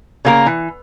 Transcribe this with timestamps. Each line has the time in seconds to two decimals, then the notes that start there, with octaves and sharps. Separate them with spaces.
0.25 C#3 A#3 A#4
0.46 E3